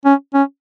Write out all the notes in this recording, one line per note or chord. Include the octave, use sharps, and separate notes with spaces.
C#4
C#4